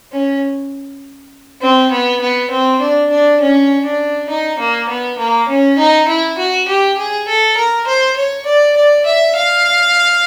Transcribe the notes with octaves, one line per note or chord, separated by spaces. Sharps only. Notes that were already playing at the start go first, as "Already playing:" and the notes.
C#4
C4
B3
B3
C4
D4
D4
C#4
D4
D#4
A#3
B3
A#3
C#4
D#4
E4
F#4
G4
G#4
A4
A#4
C5
C#5
D5
D5
E5
F5